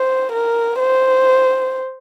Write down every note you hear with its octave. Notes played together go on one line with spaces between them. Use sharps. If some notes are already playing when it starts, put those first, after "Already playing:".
Already playing: C5
A#4
C5